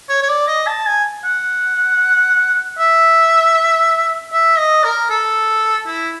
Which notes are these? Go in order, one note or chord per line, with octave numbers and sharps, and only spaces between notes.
C#5
C#5
D5
D#5
A5
G#5
F#5
E5
E5
D#5
A#4
A4
E4